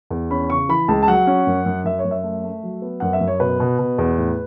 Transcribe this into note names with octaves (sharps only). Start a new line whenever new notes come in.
E2
C#4 B5
C#3 C#6
E3 B5
C#2 A5
A5
F#3 F#5
C#4
F#2
F#2
F#2 E5
C#5
F#2
E5
A3
A3
F#3
B3
F#2 F#5
E5
F#2
C#5
B2 B4
B2
B2
E2
A2